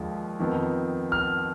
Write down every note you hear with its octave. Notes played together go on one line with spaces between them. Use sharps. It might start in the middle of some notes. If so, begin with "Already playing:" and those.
Already playing: D#2 D3 F3 G#3
F2 D#3 B3
F6